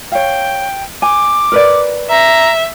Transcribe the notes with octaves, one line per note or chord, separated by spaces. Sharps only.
C#5 F5 G5
G#5 D6
A#4 B4 D5
E5 A#5